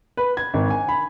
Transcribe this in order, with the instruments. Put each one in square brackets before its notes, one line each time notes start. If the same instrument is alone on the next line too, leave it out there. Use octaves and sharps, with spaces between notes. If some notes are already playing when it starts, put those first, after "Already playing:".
[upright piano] B4
G#6
G#1
G#5
B5